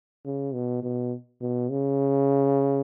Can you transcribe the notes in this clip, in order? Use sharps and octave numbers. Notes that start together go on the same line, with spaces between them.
C#3
B2
B2
B2
C#3